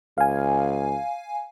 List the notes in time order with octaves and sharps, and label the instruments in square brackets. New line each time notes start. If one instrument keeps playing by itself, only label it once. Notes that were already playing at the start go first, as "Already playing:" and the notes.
[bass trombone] C#2 [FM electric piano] F5 G#5